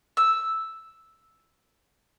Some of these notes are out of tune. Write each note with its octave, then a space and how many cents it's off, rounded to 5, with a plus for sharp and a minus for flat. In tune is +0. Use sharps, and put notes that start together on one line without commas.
E6 -5